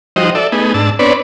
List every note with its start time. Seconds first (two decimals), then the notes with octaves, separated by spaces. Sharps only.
0.16 F3 G3 D#4 F#4 C5 D#5
0.35 A4 D5 E5
0.52 A3 B3 D#4 G#4
0.74 G#2 D4 A5 E6
0.99 B3 C4 D4 B4 C#5 D5